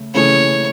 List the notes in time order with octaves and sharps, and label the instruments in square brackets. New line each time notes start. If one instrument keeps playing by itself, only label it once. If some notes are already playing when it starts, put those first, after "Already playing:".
Already playing: [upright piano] C#3 A3
[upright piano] C#3 E3 A3 C#4 G#4 [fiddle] C#5